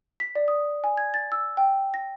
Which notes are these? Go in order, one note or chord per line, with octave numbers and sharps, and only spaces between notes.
B6
D5
D#6
G#5
G#6
A6
E6
G5
A#6